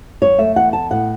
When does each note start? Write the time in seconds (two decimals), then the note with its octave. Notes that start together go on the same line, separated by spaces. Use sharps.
0.21 F#2 C#5
0.38 A3 E5
0.56 E2 F#5
0.73 B3 A5
0.90 A2 F#5